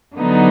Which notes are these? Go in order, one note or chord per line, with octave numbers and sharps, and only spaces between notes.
D3 F#3 B3 D#4